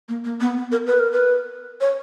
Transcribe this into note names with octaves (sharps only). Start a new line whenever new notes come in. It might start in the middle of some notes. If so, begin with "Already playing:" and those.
A#3
A#3
B3
B3
A#4
B4
A#4
B4
C#5